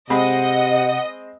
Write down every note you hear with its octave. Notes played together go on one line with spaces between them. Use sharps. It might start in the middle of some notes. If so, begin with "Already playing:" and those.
C3 G#3 C4 D#5 F#5 B5